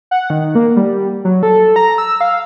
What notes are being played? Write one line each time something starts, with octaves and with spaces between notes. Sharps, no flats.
F#5
D#3
A#3
G3
F#3
A4
A#5
E6
F5